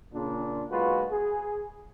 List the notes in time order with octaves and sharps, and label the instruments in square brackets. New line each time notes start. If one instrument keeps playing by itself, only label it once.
[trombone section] A#2 C#3 D4
B1 A#2 G#3 F4 F#4 B4
G#4